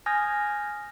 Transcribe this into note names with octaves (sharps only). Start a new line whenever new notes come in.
G#5 D#6 F6 G6 G#6 A#6